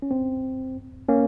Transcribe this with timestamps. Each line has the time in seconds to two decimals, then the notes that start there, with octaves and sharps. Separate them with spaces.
0.02 C#4
0.11 C4
1.09 A#3 C#4